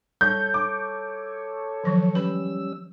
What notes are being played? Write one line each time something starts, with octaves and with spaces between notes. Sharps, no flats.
G3 A4 C#5 G6
D6
D#3 F3 F#3
G3 C#4 B4 B5 E6